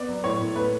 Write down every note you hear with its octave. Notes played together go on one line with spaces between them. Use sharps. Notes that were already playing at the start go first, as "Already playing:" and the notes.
Already playing: B3 D5
F#3
A2 C#5
A2
A3 B4